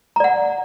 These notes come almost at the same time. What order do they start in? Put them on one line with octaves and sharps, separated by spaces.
A#5 D5 F#5